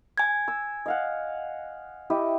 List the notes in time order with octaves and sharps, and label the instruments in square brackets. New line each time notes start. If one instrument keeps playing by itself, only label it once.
[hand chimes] G#5 G#6
[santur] E6
D#5 F5 F#5
E4 G4 D#5